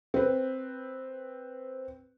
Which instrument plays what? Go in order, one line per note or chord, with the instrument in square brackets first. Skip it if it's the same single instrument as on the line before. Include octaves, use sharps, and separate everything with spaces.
[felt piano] C4 B4